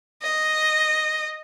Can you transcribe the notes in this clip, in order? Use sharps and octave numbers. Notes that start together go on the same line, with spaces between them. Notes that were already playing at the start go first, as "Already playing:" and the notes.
D#5